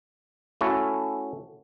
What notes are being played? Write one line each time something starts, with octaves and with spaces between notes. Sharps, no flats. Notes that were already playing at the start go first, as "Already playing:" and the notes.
A3 C#4 E4 F#4 A4